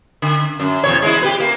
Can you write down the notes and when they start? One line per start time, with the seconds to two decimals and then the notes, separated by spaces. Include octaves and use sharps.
0.22 D3
0.60 F#2
0.84 E2 B2 C#5
1.02 G#3 B3 E4
1.23 G4 B4
1.40 A#3